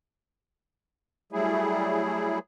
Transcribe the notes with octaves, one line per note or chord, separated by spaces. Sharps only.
F#3 G3 A3 E4 G#4